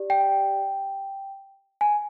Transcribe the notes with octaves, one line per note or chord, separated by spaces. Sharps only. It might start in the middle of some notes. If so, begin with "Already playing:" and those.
Already playing: G4 D5
G5
G#5